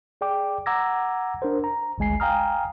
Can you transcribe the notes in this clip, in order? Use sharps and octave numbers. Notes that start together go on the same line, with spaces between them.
G#4 D5 G5 D6
F#5 A#5 D6 E6 G#6 A#6
D4 A#4 C5
A#5
G#1 D2 G#3 G#5 C7
F5 G5 G#5 A#5 D#6 F6